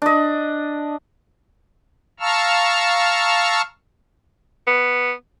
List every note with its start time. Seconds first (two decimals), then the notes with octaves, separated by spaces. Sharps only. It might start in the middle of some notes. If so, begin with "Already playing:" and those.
0.02 D4 D#5
2.20 F5 A5 A#5 C#6 E6 F6
4.67 B3